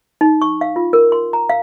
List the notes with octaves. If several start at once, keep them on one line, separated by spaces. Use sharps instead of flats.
D#4
C#6
F5
F4
A#4
C6
A#5
F5